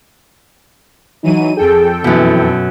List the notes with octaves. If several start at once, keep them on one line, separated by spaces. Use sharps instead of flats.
E3 F#3 D#4 D#7
F2 G#4 A4 G5
F#2 B2 E3